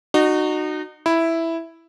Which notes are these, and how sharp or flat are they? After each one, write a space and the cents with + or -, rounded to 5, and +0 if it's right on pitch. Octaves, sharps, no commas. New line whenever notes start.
D#4 -30 F#4 +0
E4 +0 B5 +0